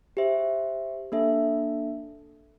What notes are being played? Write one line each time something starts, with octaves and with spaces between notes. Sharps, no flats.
G4 C5 E5
A#3 D4 A4 E5